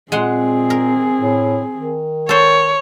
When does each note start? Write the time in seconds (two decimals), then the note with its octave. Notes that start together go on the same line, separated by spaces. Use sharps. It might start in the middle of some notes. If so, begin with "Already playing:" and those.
0.12 A#2 G#3 C4 G#4 F#5 C6
0.70 A#4
1.20 A2
1.76 D#3
2.29 A4 C5 C#5